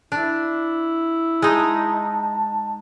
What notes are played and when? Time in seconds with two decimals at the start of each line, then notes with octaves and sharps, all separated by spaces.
0.12 D4 E4
1.42 G#3 D#4 A5